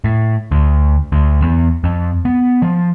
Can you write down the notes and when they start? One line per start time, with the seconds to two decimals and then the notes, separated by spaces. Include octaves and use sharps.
0.04 A2
0.52 D2
1.12 D2
1.42 E2
1.84 F2
2.25 B3
2.62 F3